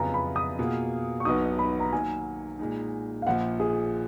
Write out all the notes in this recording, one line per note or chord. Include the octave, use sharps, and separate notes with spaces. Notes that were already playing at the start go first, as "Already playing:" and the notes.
Already playing: F2 C#3 F#3 B3 F4 G#5 A#5
B5
D#6
B2 A#3 F4 G#4
C#6
B1 B2 F#3 B3 D#4 D#6
B5
A#5
D#3 F#3 A#3 G#5
A#2 G#3 D#4
F5
A#1 A#2 F3 F#5
G#4